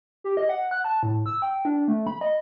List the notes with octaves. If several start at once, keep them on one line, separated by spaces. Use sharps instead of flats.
G4
D#5
F#5
F#6
A5
A2
E6
G5
D4
A3
B5
D#5